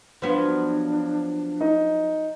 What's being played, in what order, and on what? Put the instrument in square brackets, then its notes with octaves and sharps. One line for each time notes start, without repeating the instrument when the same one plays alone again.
[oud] F3 F#3 B3 [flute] D4
[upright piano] D#4